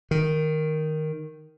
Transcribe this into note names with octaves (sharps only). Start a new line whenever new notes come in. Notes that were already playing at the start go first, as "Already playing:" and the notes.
D#3